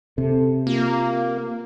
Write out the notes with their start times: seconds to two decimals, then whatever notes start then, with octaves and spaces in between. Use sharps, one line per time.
0.18 C3 A4
0.67 A#3 F4